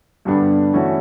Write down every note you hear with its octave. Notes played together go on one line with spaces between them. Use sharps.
G2 D3 G3 B3 D4
E3 A3 C#4 F#4